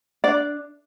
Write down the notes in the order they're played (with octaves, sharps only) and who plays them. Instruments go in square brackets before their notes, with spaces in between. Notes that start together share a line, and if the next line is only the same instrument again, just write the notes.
[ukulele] D4 D5